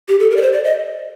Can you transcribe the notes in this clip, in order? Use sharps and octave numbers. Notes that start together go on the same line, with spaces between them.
G4
A4
A#4
D5
C5
D5
D#5